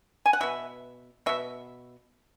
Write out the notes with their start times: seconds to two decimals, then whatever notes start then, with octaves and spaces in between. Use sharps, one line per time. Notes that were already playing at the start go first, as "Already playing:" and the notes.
0.26 G#5
0.33 F#5
0.40 B2 B3 E5
1.26 B2 B3 E5